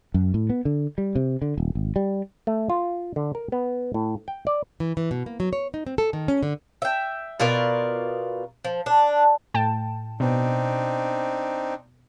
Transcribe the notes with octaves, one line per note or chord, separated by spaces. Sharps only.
F#2
A2
B3
D3
G3
C3
D3
D#1
G#1
G3
A3
F4
D3
A#4
B3
A2
G5
D5
E3
E3
B2
A#3
F#3
C#5
D#4
C4
A4
D#3
C#4
D3
E5 G5
B2 F4 A#4 D5
F3
D4
A2 G5 A5
B2 C4 D4 D#4